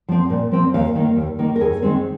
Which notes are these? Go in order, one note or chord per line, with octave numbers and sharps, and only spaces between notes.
F3 C4
A#2
F3 C4
D#2 F5
D#3 A#3
D#2
D#3 A#3
A#4
D#2 G#4
D#3 G#3 C4